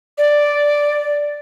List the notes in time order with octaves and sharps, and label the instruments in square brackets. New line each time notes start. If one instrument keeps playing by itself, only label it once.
[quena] D5